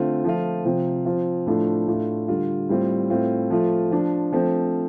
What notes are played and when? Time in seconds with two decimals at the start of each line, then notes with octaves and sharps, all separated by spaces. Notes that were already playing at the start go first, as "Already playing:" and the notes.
Already playing: D3 A3 C4 F4
0.24 F3 A3 F4
0.65 C3 F3 C4 F4
1.05 F3 C4 F4
1.46 A2 F3 A3 D4 F4
1.87 A2 A3 D4 F4
2.28 D3 G3 F4
2.69 A2 G3 C4 F4
3.10 A2 A3 C4 F4
3.50 F3 A3 F4
3.91 F3 D4 F4
4.33 F3 A3 C4